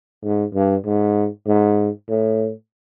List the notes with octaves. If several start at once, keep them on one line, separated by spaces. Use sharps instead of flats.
G#2
G2
G#2
G#2
A2